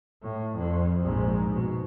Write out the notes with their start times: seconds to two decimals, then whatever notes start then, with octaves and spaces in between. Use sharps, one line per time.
0.23 A2
0.56 F2
1.01 A#1 G#2
1.54 B2